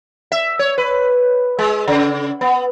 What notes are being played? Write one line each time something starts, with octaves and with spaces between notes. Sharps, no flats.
E5
C#5
B4
G#3
C#3
B3